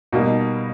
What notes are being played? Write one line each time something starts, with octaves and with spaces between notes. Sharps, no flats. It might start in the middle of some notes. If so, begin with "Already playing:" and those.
B2 G3 A#3 D#4